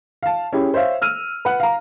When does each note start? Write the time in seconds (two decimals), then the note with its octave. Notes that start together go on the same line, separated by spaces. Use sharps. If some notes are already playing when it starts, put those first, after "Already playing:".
0.23 F5 A5
0.53 C#4 E4 G4 G#4
0.74 C5 C#5 E5 F5
1.02 E6 F6 D#7
1.45 B4 F#5
1.60 F5 A#5